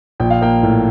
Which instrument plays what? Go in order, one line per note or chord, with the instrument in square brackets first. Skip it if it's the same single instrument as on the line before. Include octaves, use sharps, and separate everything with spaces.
[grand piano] A#1 G5
F5
A#3 G5
A2